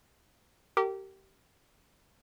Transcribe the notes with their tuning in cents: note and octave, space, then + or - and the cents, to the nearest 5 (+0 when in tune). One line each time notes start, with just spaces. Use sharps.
G4 -25 A#4 -35